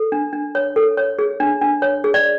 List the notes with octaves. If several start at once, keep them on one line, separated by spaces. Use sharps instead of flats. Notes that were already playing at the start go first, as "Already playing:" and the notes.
Already playing: A4
D4
D4
C#5
A4
C#5
G#4
D4
D4
C#5
G#4
D5